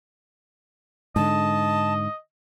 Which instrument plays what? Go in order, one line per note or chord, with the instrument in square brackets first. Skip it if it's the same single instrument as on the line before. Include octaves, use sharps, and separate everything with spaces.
[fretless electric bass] G#2 D3 [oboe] D#5 [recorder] A5